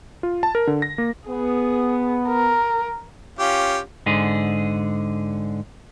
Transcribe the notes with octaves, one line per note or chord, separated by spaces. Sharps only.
F4
A5
A#4
D3
A#6
A#3
B3 G#4
A#4
C#4 F4 G4
G#2 D3 G#4